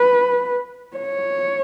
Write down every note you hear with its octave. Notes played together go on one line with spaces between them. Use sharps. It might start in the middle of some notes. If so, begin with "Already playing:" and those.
Already playing: B4
C#5